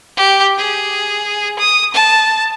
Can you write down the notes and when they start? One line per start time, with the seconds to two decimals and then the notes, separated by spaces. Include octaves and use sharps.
0.17 G4
0.58 G#4
1.59 D#6
1.94 A5